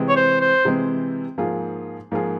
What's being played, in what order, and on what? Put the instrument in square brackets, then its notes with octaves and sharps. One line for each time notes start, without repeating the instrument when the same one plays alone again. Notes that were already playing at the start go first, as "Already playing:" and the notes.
Already playing: [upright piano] C3 E3 G#3 C4
[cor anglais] C#5
C5
C5
[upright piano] C3 E3 G#3 C4
G#2 F3 A#3 F4 G#4
G#2 F3 A#3 F4 G#4